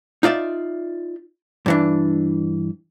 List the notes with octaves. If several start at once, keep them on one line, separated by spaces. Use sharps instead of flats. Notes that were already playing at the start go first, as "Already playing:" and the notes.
D#4 F4 D5 E5
G2 E3 D4